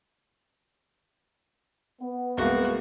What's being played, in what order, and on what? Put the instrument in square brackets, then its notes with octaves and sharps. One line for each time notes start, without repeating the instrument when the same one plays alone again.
[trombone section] B3
[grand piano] C2 G#3 A#3 [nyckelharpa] F#4